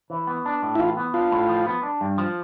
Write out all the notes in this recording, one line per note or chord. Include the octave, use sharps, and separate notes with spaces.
E3
B3
D4
A2
E4
E3 F4
B3
D4 F4
A2
F3
B3
D4
G2
F3